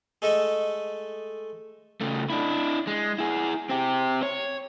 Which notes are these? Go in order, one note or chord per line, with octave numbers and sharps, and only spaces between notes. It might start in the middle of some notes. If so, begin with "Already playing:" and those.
G#3 A3 A4 D#5
C#3 A3
D4 E4
G#3
E4 G#4
C4 G4
C#5